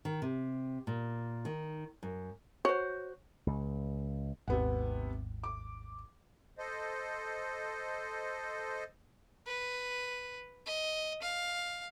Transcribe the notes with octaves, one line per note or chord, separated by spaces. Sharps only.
D#3
C3
A#2
D#3
F#2
F#4 C5 C#5
C#2
G#1 D#2 C3 B3 F#5
D6
A4 C5 D#5
B4
D#5
F5